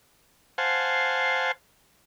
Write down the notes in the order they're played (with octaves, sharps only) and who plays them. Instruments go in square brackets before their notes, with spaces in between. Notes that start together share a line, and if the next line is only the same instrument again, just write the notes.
[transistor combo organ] C5 F5 F#5 G#5 A5